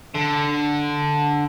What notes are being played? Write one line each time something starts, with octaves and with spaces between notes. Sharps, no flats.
D3